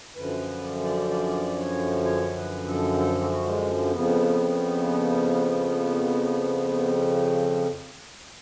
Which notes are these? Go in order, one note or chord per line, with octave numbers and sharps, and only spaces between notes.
F#2 D3 F3 B4
D5
D5
D5
C#5
C#5
B4
A4
A4
F#4
G#3
F2 C#3 F3 B3